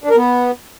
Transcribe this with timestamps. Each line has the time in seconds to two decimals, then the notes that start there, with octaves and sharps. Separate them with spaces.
0.04 D4
0.10 A#4
0.16 B3